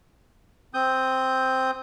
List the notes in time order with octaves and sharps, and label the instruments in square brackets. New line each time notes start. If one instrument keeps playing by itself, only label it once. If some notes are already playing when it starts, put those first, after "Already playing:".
[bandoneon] C4 D#6 G6